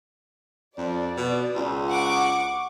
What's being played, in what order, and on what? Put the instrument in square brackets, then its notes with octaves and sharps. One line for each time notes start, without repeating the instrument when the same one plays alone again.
[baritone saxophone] F2 [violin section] D5
[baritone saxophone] B2
C#2
[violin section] F#5 C#6 D6